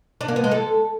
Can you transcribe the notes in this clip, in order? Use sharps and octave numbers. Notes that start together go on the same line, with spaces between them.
D4
A#3
B3
G#3
A4